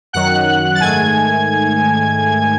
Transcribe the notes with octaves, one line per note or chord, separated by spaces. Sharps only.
F#2 D#3 F#3 F#5 F#6
A6
G#2 D#3 A3 G#5 G#6